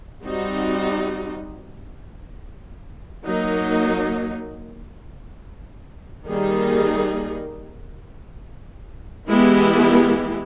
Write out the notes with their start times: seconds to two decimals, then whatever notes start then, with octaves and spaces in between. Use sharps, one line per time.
0.25 G3 C4 D#4 F#4
3.26 F#3 A#3 D#4
6.26 D#3 G3 A#3 D#4 G#4
9.28 E3 G#3 B3 E4 G4